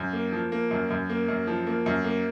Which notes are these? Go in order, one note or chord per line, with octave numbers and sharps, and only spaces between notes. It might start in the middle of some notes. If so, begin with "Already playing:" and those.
Already playing: F#2
A#3
F3
A#3
F#2
F#2
A#3
F#2
F3
A#3
F#2
A#3